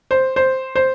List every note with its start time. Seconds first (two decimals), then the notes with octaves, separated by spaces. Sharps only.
0.11 C5
0.36 C5
0.75 C5